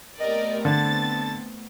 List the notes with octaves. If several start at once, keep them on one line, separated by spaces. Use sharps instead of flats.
A3 B3 C4 G4 A#4 D5 D#5
D3 A5 A6